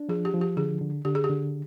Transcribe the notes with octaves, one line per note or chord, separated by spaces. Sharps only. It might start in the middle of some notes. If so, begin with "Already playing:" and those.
Already playing: D4
F3 G#4
G4
F3
G4
D3 G#4
D3
D3 G4
G#4
G4
D3